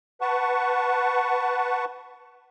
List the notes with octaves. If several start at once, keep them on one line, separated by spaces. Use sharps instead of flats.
B4 F#5 A5 C#6